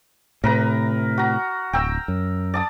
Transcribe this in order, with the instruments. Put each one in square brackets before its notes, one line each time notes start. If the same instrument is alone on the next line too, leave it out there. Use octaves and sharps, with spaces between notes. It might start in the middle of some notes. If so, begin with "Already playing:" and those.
[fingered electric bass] A2 C3 [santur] A#4 B4 A#5
[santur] F#4 A#5
[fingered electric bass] D1 [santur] G5 A#5 E6
[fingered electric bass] F#2
[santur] D5 A5 D#6